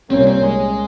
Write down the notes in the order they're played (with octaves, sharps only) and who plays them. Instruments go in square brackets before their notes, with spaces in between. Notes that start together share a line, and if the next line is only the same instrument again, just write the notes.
[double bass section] C2 A#2 G3 A#3 C#4 [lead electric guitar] C4
[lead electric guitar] C4
G#3